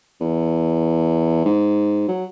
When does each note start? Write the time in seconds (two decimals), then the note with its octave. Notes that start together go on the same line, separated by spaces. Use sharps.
0.21 E2
1.45 G#2
2.08 F#3